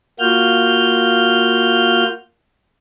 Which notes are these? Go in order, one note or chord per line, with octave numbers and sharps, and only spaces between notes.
A#3 F4 F#4 F6 G6